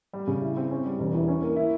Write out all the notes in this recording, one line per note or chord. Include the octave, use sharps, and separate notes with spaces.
G3
C#3
E4
C4
C#4
G3
E1
E3
C#4
A#3
E4